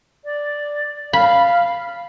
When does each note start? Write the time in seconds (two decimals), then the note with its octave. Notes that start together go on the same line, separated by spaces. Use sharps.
0.25 D5
1.13 F5 B5